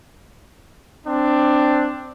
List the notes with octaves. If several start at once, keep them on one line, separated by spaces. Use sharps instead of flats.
C4 D4